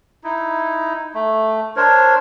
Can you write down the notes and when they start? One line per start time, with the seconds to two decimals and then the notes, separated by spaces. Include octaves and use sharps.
0.24 D#4 E4
1.14 A3
1.76 D4 A#4 C5 C#5